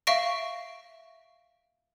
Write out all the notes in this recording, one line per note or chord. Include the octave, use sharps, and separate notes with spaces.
E5 F5 C#6 A#6 D7